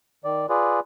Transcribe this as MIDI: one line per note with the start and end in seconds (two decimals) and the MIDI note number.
0.24 0.46 51
0.24 0.46 74
0.49 0.80 65
0.49 0.80 68
0.49 0.80 71
0.49 0.80 74